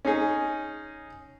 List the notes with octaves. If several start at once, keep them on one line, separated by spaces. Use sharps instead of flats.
C#4 D#4 G#4